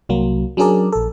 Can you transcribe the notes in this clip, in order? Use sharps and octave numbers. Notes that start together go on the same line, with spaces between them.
C2 F#3 A#3
F#3 C#4 D4 G#4 A#4 D5
A#1 A4